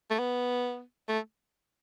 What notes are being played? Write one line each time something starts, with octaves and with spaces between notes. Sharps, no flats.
A3
B3
A3